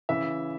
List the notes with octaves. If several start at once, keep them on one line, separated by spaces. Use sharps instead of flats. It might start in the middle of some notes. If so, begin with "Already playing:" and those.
C#3 E3 E5